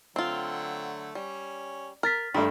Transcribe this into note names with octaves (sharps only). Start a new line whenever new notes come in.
D3 F#3 A3 C4 F4
G3 C#4
A#4 F6 A6 B6
G2 G3 A3 C4 D4 A#4